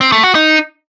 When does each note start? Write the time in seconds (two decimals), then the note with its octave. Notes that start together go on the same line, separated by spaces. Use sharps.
0.01 C4
0.12 A3
0.24 F#4
0.35 D#4